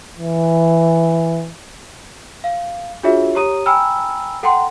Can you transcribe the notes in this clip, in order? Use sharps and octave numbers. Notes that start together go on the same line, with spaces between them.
E3
F5
D4 F4 F#4 G#4 C#5 E5
G4 C#5 A#5 D#6 D#7
G5 G#5 A#5 B5 E6 F6
A4 F#5 G5 A#5 C6